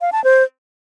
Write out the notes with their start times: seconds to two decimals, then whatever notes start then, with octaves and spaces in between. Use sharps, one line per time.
0.01 F5
0.12 A5
0.24 C5